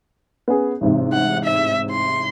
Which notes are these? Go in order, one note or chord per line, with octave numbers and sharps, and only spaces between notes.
B3 C#4 G#4
A1 G#2 C3
F#5
E5
C6